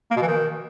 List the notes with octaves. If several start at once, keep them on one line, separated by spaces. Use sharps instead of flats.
A#3
B2
E3
D#3